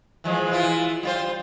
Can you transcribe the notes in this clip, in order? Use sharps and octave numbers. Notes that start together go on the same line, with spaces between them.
E3 F3 G#3
E3 E4 F4
G3 F4 C5